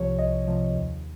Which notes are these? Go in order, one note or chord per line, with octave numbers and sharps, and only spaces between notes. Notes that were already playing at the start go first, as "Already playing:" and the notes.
Already playing: C2 C3 F3 C#5
C2 D#5
C3 F3
D#2